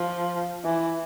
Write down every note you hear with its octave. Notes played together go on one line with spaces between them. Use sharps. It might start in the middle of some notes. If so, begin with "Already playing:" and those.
Already playing: F3
E3